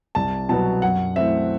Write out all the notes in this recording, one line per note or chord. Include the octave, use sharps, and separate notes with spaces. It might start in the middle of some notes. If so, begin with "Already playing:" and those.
C2 A5
B2 F#3 B3 A5
F#2 F#5
E3 A3 C4 E5